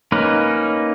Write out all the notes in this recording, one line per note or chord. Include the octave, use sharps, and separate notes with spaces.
A#3 C#4 D#4 B4